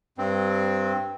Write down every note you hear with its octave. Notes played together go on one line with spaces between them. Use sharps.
G2 C4